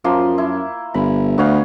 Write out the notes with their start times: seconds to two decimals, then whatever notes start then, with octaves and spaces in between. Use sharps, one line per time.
0.04 F#2 F3 A#3 C6
0.38 E4
0.94 G1 B5
1.38 D2 B3 C#5 F5